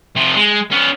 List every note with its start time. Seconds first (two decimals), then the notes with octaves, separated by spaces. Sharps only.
0.16 C3 F3
0.36 G#3
0.72 B3 C#4